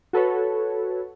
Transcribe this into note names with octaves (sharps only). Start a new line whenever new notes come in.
F#4 A4 B4 C#5